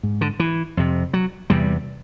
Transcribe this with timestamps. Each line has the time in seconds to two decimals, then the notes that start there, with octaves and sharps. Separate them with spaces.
0.03 G#2
0.21 D3
0.40 E3
0.77 F2 C3
1.13 F#3
1.50 E2 C3 G3